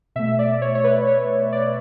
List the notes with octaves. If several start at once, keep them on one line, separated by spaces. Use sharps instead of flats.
B2 A3 E5
D5
C#5
C#5
B4
C#5
D5